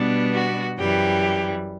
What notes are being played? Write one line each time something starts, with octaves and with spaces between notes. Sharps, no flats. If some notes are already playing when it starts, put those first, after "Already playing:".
Already playing: B2 G3 B3 D4
F#4
F#2 E3 G3 G4